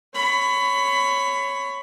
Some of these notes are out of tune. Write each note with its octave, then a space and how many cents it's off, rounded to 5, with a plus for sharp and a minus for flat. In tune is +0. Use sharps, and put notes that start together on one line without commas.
C#5 +0 B5 +20